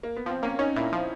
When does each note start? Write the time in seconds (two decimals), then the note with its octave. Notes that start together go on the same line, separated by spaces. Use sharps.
0.03 A#3
0.16 B3
0.26 F3 C4
0.42 A#3 C#4
0.59 C#4 D#4
0.76 A#2 E4
0.92 F3